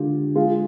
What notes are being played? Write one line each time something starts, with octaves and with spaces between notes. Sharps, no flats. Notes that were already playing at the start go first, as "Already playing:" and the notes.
Already playing: D3 G#3 F4 G4
G#3 F4